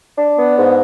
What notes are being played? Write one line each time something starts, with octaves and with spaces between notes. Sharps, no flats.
D4
B3
G#2